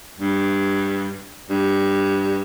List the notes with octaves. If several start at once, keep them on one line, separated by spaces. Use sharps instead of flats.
G2
G2